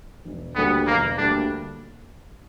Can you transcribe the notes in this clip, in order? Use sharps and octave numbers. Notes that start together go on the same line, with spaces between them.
E1
D2 D3 G3 A#3 B3
E1 A#3
D2 D3 G3 A#3 D4